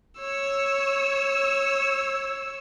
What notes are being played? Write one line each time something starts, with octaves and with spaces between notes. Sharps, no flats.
C#5 E6